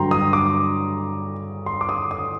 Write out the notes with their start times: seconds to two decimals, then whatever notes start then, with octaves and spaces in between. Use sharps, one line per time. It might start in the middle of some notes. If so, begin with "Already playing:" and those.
Already playing: G2 D3 F#3 G5 A#5 C6
0.11 D#6
0.33 D6
1.66 C6
1.81 D6
1.89 D#6
2.11 D#6